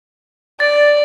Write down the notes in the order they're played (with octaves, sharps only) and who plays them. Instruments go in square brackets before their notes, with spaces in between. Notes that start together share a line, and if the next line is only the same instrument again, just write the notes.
[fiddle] D5 [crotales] A6